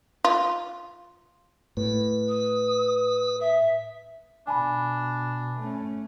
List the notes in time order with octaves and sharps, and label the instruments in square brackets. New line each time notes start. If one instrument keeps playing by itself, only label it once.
[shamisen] F4
[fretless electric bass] A2 [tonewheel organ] B4
[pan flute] D#6
E5
[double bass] B2 [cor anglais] D4 [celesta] G#5 A5 B5
[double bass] A3 C#4